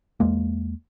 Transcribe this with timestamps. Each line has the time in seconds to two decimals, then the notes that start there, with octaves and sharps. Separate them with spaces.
0.20 E2 G#3 A#3